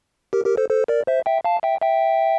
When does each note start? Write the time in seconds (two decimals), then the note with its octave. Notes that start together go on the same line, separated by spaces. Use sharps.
0.33 G4 A#4
0.46 G4 A#4
0.57 A4 C5
0.70 A4 C5
0.88 A#4 D5
1.07 C5 E5
1.26 E5 G5
1.44 F5 A5
1.63 E5 G5
1.81 E5 G5